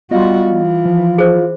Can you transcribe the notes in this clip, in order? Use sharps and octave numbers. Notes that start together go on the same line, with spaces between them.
G3 B3 F4 F#4 D#5
E3
F3
G#4 C5